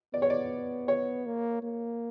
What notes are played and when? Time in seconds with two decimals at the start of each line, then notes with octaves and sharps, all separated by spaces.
0.14 B3 D5
0.22 C#5
0.30 D5
0.88 C#5
1.26 A#3
1.63 A#3